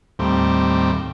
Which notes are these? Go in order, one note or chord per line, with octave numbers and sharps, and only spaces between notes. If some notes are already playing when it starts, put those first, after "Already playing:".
D#2 A2 G3 C4